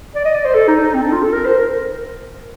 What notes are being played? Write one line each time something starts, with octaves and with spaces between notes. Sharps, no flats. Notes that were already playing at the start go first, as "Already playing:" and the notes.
D5
D#5
D5
C5
A4
D#4
D#4
C4
D4
F4
A4
A#4
C5
A#4